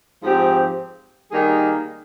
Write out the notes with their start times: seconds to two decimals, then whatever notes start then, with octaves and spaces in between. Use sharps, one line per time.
0.22 G#2 F3 C4 G4
1.32 D#3 G3 A#3 D#4 G#4